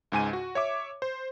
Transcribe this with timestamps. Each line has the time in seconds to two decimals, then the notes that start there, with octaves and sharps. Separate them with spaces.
0.12 C#2 G#2 G#5 D#7
0.33 F#4
0.55 C#5 E5 D6
1.02 C5